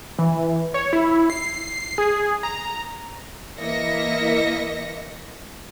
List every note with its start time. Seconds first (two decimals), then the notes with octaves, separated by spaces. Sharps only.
0.19 E3
0.74 C#5
0.93 E4
1.30 C7
1.98 G#4
2.43 A#5
3.59 E3 A#3 D#5 E5 A#6 C#7